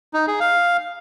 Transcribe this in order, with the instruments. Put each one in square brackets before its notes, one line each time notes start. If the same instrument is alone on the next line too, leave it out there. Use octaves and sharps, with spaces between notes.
[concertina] D#4
G#4
F5